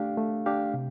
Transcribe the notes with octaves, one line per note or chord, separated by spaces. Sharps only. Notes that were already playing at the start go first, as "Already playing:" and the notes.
Already playing: A3 D4 G4 F5
A3
D4 G4 F5
C3